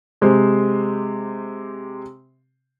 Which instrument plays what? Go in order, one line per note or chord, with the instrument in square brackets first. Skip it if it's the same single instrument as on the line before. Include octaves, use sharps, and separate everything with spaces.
[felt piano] C3 G#3 G4 C5